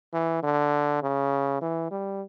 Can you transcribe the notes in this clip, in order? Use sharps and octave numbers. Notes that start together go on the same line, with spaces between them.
E3
D3
C#3
E3
G3